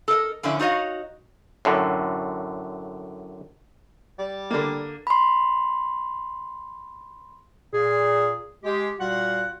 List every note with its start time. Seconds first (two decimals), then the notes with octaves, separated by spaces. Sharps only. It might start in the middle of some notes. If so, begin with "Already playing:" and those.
0.08 A4 A#4 D5 D#5
0.43 A2 D3 F3 C#4 D5 E5
0.59 D#4 F#4 C#5 D#5 F5
1.65 F#2 A2 D3
4.18 G3
4.51 D3 A#3
5.07 B5 C6
7.73 A#2 G#4
8.63 G#3 G4
9.00 A#2 G3 F4 F#4 F#5